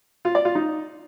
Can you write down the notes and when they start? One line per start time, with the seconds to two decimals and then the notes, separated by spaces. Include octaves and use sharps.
0.25 F4
0.35 D5
0.45 F4
0.55 D#4